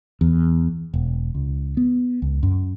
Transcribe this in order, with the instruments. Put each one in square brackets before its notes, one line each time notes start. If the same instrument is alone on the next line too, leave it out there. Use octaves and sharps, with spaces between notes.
[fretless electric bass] E2
E1
C#2
B3
C#2
F#2